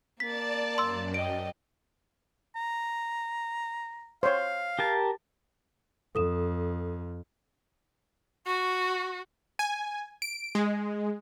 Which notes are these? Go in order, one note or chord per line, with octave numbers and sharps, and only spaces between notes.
A#3 D5 A5 A6 B6
F#2 C6 E6
D#5 G5 D7
A#5
C5 C#5 F5
G4 A#4 A5
F2 A4 D#6 E7
F#4 C#6
G#5
D7
G#3